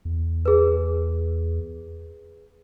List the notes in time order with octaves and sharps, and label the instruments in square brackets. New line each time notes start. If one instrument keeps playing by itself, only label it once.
[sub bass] E2
[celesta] G#4 B4